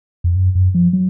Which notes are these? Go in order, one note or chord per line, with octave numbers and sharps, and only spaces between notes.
F2
F#2
F#2
F3
F#3